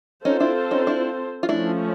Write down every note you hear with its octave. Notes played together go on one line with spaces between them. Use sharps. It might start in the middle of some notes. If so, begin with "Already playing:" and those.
C4 C#4 D#4 F4 A4 C5
D4 E4
C#4 D#4
D4 E4
F4
F3 A3 C#4 D4 E4